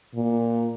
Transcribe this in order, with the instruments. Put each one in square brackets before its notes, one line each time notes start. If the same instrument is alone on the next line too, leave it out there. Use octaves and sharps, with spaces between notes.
[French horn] A#2